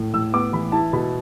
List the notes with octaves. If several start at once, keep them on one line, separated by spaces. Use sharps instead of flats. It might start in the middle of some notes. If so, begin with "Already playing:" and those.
Already playing: A2 A3
A2 E6
B3 D6
E3 B5
E4 A5
B2 B5